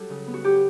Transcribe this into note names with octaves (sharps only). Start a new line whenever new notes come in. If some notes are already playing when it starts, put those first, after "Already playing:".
Already playing: F#3 G3 C#4 A4
C#3
B3
F#4
F#3 G4